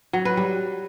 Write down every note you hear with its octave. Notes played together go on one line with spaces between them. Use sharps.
F#3
B4
G3